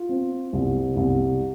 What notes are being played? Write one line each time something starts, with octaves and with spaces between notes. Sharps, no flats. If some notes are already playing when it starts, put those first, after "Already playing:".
Already playing: F4
C4
C2
C2